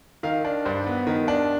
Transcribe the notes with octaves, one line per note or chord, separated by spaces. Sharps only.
D#3 F5
D4
G2 C5
B3
D#3
D4